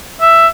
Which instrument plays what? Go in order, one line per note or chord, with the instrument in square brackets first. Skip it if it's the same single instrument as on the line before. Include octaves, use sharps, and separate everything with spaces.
[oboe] E5